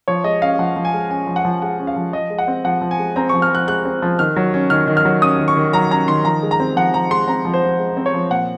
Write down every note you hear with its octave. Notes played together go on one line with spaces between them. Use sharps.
F3 C#5
G#3 D#5
C#4 F5
F3 F#5
F3
G#5
G#3
C#4 G#5
F3
F#5
F3
G#3 F#5
C#4
F5
F3
F3 D#5
G#3
F#5
C4
F3 F#5
F3
G#5
G#3
C4 A#5
F3 C#6
F6
F3 F#6
G#3 F#6
C4
F3
D#3 F6
F#3
C#4
D#3 F6
D#3
F6
F#3
C#4 D#6
D#3
C#6
D#3
F#3 A#5
C#4 A#5
D#3 C6
F3 A#5
G#3
A#5
C4
F3 F#5
F3 A#5
G#3 C6
C4 A#5
F3
C5
F3
G#3
C4
C#5
F3
A#2 F#5